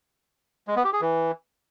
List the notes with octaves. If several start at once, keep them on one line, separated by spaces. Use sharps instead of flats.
G#3
B3
G4
G#4
E3